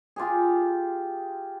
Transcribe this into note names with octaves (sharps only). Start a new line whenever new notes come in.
F4 G4 G#4